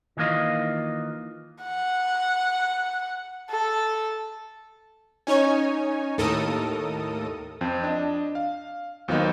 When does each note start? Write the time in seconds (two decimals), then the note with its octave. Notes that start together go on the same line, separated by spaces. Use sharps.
0.17 D#3 E3 A#3 F4 D#5
1.63 F#5
3.50 A4
5.27 C#4 D#4 C#5 G#5
6.18 D#2 A2 A4 A#4 D#6
7.61 F2 C4
7.83 D4 D#5
8.35 F5
9.08 D#2 F3 F#3 A#3 B3 D#4